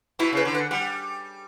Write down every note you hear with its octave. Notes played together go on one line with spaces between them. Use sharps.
B2 E4
C#3 B4
D3
F#5
G3 F#5